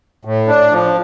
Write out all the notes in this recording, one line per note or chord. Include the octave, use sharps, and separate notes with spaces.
A2
D4
F3